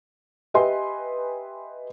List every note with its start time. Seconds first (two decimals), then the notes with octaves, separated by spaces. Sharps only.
0.54 G4 B4 D#5 E5 G#5 C6